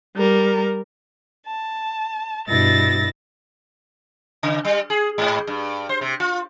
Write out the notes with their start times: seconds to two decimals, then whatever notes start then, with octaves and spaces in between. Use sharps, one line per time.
0.16 G3 A#4
1.47 A5
2.48 G2 B2 E4 A6 A#6
4.43 C#3
4.65 G3
4.90 G#4
5.18 G#2
5.47 G2
5.89 C5
6.01 C3
6.20 F4